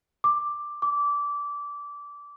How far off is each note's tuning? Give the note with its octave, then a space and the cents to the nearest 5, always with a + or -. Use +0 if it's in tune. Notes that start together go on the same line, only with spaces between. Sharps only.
D6 +5
D6 -20